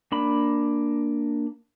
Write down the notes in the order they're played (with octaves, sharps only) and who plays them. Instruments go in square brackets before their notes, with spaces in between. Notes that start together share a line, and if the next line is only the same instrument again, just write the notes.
[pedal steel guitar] A#3 D4 B5